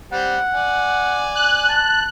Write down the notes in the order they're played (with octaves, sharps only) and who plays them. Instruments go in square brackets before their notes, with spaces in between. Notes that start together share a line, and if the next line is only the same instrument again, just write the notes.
[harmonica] G3 C4 [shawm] F#5
[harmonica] D5 G#5
[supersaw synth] F#6
[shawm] A5